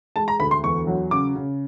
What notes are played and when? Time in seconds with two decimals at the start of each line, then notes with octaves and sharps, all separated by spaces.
0.16 G#3 A5
0.28 A#5
0.40 D2 B5
0.51 C6
0.63 E2 C#6
0.87 F#3
1.11 C#3 D6
1.35 C#3